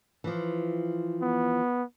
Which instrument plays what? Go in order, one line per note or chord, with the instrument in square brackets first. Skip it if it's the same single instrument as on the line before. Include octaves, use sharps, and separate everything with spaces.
[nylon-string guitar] E3 F3
[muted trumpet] B3